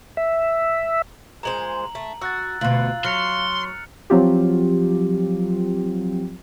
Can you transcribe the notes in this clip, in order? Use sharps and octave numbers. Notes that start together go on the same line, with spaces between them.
E5
A#2 G#3 C5 A#5 F#7
A3
F#4 E6 F#6 A6
D2 B2 F4 F#7
F#3 C6 F6 C#7 F7
F3 F#3 C4 F4 G4